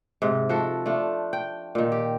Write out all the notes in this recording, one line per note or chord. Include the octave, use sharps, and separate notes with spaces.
G#2 C3
F3 F#4 A4
A3 D4 F4
G5
A#2 D#3
G4